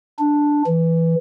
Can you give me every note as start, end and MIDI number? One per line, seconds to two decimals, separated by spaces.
0.19 0.62 62
0.67 1.15 52